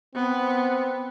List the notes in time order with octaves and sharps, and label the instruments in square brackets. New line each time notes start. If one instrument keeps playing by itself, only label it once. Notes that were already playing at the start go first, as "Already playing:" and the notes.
[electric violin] B3 [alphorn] C4